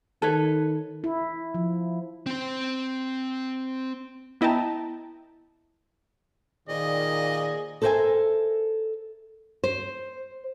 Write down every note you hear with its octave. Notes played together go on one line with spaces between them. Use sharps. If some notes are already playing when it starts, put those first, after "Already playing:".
D#3 A4 B4 C#5
E4
F3
C4 C5
B3 E4 D#5 G5 A5 A#5
A#2 D#3 G#4 C5 D5 D#5
A4 A#4 C5 C#5 E5 G#5
C5